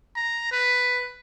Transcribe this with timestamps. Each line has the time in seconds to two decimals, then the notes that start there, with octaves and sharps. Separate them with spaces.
0.16 A#5
0.52 B4